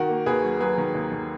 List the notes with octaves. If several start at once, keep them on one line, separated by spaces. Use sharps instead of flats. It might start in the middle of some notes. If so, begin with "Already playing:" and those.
Already playing: D#3 F#4 A#4
A#3
D#2 G#4 B4
F#3
F#3 G#4 B4
D#3
D#2
D#3